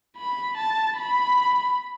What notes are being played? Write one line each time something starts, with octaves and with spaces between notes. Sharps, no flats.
B5
A5
B5